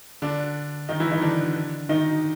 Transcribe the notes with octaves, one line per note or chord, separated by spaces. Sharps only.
D3 D4
D#3 D#4
E3 E4
D#3 D#4
D3 D4
D#3 D#4